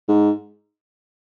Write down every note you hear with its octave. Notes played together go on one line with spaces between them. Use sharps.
G#2